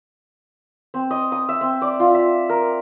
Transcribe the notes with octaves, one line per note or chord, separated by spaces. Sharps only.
C4
D#5
D#6
E5
C4
D5
F4
E5
A#4